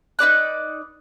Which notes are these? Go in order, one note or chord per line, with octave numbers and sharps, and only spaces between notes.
D#4 B4 D5 F#6